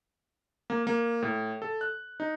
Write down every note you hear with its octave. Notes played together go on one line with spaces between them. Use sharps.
A#3
A#3
A2
A4
F#6
D#4